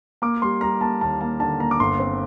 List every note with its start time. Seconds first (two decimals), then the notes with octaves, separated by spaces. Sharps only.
0.22 A#3 D6
0.42 G3 C6
0.61 G3 A#5
0.81 A#3 A5
1.01 D#2 A5
1.21 A#3 A5
1.40 D3 A5
1.59 A#3 A#5
1.71 D6
1.80 G1 C6
1.99 C4